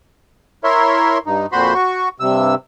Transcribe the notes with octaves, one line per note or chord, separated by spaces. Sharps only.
E4 A#4 C#5 E5 C6
G2 D#4
F2 A#2 F#4 C5 B5 C6
F#4 C#6
G2 C3 E6